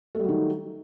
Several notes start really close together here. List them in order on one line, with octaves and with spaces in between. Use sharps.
A3 G3 F#3 D#3